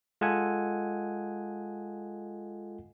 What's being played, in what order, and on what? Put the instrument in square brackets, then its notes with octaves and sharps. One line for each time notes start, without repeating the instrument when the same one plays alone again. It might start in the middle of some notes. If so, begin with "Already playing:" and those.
[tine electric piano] G#3 F4 A4 D#5 F#5 G#5